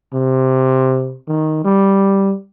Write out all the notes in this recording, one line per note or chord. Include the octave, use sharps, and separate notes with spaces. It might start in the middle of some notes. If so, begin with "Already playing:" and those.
C3
D#3
G3